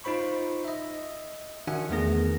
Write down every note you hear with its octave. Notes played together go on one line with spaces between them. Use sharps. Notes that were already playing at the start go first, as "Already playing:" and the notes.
D#4 F4 C5 B5 C#6
D#5 E5
D#3 D4 F#4 E5 F#5 G#5
E2 D#3 A3 B3 G#4 A#6